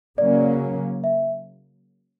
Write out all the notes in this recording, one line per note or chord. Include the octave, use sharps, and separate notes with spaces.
C#3 F#3 A#3 C#4 D5
E5